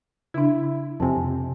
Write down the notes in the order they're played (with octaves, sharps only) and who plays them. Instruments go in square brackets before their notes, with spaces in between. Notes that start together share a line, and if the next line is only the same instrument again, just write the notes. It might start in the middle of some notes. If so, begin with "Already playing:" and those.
[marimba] C#3 D4 [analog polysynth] E4
[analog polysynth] F2 C3 [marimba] G#5 A5